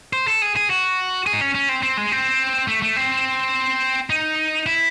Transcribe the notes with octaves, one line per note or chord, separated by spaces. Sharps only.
C5
A4
G#4
G#4
F#4
G#4
D#4
C#4
C#4
C4
C4
G#3
C4
A3
A3
C4
D#4
E4